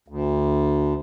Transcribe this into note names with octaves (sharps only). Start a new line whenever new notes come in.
D2